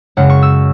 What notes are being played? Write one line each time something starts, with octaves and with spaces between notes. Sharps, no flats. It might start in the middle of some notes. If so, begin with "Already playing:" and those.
F#2 C#3 G#3 F#5
C#6
E6